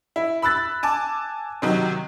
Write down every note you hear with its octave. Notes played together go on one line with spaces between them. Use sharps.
E4
B5 E6 F#6 A6
G#5 A5 D6
C3 D#3 F#3